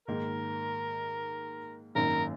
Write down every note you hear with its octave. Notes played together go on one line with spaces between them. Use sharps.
G#2 D#3 A#3 A#4
G#1 F#2 D#3 A#3 A#4